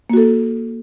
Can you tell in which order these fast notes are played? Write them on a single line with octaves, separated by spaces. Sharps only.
A#3 F#4 A4